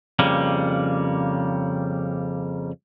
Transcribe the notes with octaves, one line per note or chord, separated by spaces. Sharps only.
F2 C#3 G3 A#3